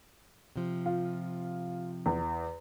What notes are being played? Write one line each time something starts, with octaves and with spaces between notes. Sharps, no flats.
C3 F3
F4
E2